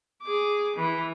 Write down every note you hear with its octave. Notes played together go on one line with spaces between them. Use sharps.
G#4 D6
E3